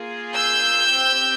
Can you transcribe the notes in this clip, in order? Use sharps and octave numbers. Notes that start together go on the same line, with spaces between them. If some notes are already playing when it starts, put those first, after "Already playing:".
Already playing: A#3 F4 G#4
E6 G6
C4 G4